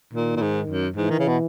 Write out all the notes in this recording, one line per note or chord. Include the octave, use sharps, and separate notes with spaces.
A#2 D#3
A#2
G#2
F#2
G#2 E3
D#3
C#3
B2